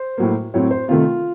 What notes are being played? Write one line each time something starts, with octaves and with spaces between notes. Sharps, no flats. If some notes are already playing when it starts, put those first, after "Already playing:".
Already playing: C5
A2 F#3 A#3
A2 F#3 C4 C#5
C5
C3 D#3 A3 F4 F5